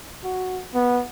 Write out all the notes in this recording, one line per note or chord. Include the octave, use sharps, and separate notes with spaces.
F#4
B3